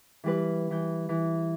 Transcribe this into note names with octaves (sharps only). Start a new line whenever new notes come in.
E3 G3 B4
E3 G6
E3